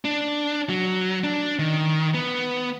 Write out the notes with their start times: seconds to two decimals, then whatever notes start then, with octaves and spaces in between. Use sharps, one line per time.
0.05 D4
0.69 F#3
1.24 D4
1.59 D#3
2.14 B3